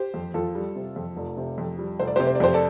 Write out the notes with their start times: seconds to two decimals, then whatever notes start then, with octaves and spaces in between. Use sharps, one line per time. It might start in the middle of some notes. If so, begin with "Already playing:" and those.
Already playing: G4 C5
0.14 F2
0.34 F2 F4 A4
0.55 G3
0.76 C3
0.96 F2
1.16 F1
1.37 C3
1.58 F2
1.79 G3
1.99 F1 C5
2.07 D5
2.16 C3 G4 C5
2.27 C5
2.35 D5
2.40 F2 G4 C5
2.54 A4 D5